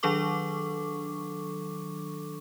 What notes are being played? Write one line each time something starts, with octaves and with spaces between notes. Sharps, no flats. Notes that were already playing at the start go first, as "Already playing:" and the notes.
D#3 F#3 D4 A4 C#6 D6